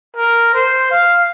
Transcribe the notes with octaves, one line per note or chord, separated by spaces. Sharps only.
A#4
C5
F5